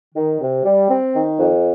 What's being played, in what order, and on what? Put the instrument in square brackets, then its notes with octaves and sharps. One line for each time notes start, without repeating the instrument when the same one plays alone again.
[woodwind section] D#3
C3
G3
C4
D#3
F2